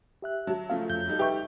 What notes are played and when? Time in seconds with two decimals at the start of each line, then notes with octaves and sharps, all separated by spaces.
0.22 G4 E5 F#6
0.47 F#3 A5
0.70 C#3 F3 A3 F5
0.90 F2 G6
1.08 G3 D#4 A4
1.19 G4 B4 E5 C#6